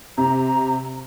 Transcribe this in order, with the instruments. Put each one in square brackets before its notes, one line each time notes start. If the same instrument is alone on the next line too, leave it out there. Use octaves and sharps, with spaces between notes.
[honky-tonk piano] C3 [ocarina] A#5